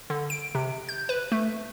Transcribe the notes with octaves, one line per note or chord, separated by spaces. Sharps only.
D3
D7
C3
G6
B4
A3